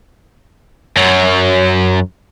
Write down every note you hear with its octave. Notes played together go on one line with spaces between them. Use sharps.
F#2 F#3